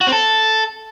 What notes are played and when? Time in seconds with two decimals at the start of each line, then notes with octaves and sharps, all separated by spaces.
0.01 F#4
0.07 C4
0.12 A4